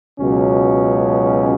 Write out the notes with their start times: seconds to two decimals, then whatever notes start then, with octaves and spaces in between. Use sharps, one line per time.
0.18 C#2 B2 F#3 C#4